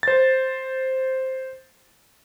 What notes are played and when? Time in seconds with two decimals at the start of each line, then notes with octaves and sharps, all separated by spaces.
0.03 C5 A6